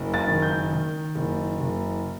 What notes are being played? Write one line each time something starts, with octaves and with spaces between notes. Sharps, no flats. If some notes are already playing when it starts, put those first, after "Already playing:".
Already playing: F#1
A6
D#3
G6
D#3
F#1
F#1